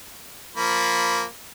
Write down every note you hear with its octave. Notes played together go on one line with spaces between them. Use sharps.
F3 A#3 B5